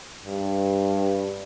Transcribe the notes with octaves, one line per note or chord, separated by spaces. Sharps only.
G2